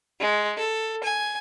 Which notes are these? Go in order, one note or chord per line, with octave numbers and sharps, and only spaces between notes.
G#3
A4
G#5